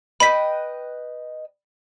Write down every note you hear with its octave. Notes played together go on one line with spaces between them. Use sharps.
B4 D#5 G5 B5 B6